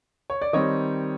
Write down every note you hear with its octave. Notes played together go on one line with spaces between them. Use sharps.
C#5
D5
D#3 G3 C4 C#5 D#5